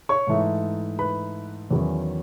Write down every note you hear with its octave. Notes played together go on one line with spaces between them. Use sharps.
C#5 C#6
G#2 E3 A3 D#4
B4 B5
E2 D#3 F#3 C#4